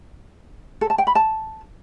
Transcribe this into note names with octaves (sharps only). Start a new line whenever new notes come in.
A4
A5
G5
B5
A5